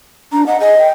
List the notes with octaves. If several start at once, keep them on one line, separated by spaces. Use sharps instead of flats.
D4 A#5
D#5 F#5
G#4 D#5
G5